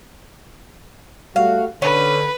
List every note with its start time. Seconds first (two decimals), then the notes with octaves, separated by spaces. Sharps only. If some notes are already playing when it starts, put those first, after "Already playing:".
1.36 G3 A3 F#4 F5
1.82 D3 C#4 B4